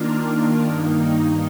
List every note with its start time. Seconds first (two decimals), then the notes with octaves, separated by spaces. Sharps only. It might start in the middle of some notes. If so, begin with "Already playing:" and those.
Already playing: D#3 A#3 D4 F4 A#4
0.65 G2 D#3 A#3 D#4